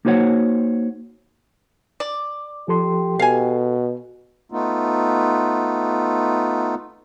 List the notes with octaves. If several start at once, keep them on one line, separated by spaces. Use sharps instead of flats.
A#3 D#4 F#4 C5 C#5 F#5
D5
F3 G4 A4 C6
B2 A4 F5 G#5
A3 B3 D#4 F4